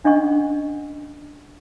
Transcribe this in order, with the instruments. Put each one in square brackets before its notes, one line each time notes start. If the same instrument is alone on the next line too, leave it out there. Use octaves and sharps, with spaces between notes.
[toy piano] C#4 D4 D#5 F#5 C#6